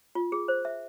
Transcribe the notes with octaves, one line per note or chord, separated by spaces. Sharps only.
F4
G#4
C5
E5